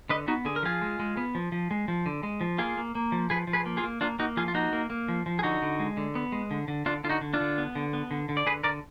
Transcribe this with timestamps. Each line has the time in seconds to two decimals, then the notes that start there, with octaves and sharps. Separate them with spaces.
0.09 D3 B4 D#5
0.28 B3 D#4 F#4
0.45 D3 G#4
0.56 A#4
0.63 F3 F4 G#4
0.82 G#3
0.99 G#3
1.17 B3
1.35 F3
1.52 F3
1.71 G#3
1.88 F3
2.06 D3
2.23 G#3
2.41 F3
2.58 A#3 F4 G#4
2.77 A#3
2.95 A#3
3.12 F3
3.30 F3 G#4 B4
3.47 F3
3.53 G#4 B4
3.66 A#3
3.77 F4 G#4
3.84 A#3
4.01 A#3 D4 F4
4.19 A#3 D#4 F#4
4.37 F3 F4 G#4
4.48 F4
4.54 A#3 D#4 F#4
4.73 A#3
4.90 A#3
5.08 F3
5.26 F3
5.39 G#4
5.43 D3 D#4 F#4
5.62 D3
5.80 G#3
5.97 D3
6.15 B3
6.32 G#3
6.51 D3
6.68 D3
6.86 D3 D4 F4
7.04 D3 F4
7.09 D#4 F#4
7.21 D3
7.34 D4 F4
7.40 D3
7.58 B3
7.75 D3
7.93 B3
8.11 D3
8.29 D3
8.37 D5
8.46 D3 G#4 B4
8.64 D3 A#4 D5